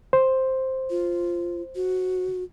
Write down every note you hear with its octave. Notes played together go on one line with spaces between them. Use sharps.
C5
F4
F#4